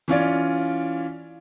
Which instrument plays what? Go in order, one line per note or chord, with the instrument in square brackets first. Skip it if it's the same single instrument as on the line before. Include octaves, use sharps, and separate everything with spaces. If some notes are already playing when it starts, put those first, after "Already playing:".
[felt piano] E3 C#4 F4 D5